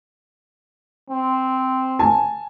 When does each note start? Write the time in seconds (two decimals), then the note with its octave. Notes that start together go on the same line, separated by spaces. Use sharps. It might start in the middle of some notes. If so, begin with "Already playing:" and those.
1.09 C4
1.99 G#5 A5